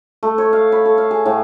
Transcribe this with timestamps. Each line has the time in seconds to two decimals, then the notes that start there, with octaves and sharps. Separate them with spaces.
0.23 A3
0.38 C#5
0.53 F5
0.72 B5
0.85 A4
0.98 F5
1.11 G#4
1.26 A2